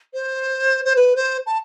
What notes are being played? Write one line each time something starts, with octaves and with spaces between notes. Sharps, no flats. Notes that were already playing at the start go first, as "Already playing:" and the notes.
C5
C5
B4
C5
A5